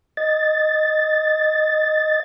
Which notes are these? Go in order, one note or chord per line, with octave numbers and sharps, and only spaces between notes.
D#5 A6